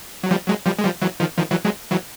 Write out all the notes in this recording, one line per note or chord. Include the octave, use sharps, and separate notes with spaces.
F#3
F3 G3
F#3 G#3
F3 G3
G#3
F3 G3
E3 F#3
D#3 F3
D#3 F3
E3 F#3
F#3 G#3
E3 F#3